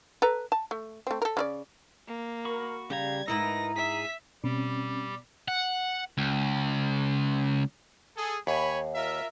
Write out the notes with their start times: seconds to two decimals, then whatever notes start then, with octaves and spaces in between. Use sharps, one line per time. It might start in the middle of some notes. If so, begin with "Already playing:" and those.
0.22 A4 B4 A#5
0.52 A5
0.71 A3
1.07 A3 C4
1.22 A4 A#4
1.37 C#3 E4 D5
2.07 A#3
2.45 F#4 A#4 B5 C#6
2.90 C#3 G3 G4 F5 A#5 G#6
3.28 G#2 D#4 E4 A#4 B4 D#5 A#5 A#6
3.76 G#4 E5 B6
4.44 B2 G3 C4 C#4 G4
5.48 F#5
6.18 C#2
8.17 G#4 A4
8.47 D#2 C#5 G#5 B5
8.95 F4 A#4 E5